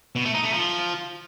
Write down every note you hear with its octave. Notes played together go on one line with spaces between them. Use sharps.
B2
A3
D#4
A3
F3